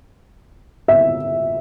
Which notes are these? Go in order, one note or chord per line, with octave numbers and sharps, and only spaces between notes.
E5